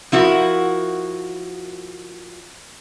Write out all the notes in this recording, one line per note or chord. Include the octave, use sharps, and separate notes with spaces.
F3 E4 F#4 A#4